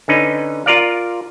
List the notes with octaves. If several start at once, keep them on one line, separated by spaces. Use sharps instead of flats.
D3 C#4 D#4 B4
F4 A#4 D5 F5